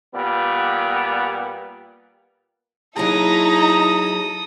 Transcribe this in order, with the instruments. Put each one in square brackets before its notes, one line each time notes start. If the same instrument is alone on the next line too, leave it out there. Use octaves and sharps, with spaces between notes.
[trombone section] A#2 G3 B3
[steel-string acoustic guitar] F#3 A#3 G#4 [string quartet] D#4 E4 [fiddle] A4 D#6 [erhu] A#5